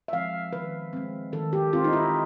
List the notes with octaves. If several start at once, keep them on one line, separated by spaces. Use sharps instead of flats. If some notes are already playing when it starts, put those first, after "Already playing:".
E5
F3 G#3 C4 F5
D#3 B4
G#3 C4
D#3 A4
G4
G#3 C4 F4
D#4
E4